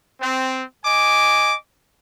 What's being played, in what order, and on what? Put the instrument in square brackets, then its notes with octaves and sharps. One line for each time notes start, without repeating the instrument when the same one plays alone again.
[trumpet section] C4
D#5 G#5 D6